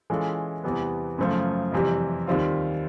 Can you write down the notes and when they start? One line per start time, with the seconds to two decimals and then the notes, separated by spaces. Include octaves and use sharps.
0.10 E3 G#3 C#4 F4 A4
0.64 E2 C3 E3 G3 B3
1.18 F#2 C#3 F3 A3
1.72 F2 C3 E3 G3
2.27 D#2 D#3 G3 C4 F4